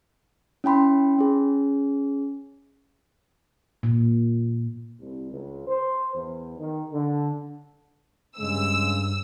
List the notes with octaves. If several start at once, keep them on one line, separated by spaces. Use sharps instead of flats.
C#4 E4 G5 B5 C6
C#4 G#4
A#2
C2
C#2
C5
E2
D#3
D3
G2 C#3 G#3 E6